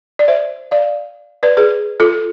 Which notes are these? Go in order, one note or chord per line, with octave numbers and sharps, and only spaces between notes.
D5
C5 E5
D5 F5
B4 D5
G#4 B4
F4 A4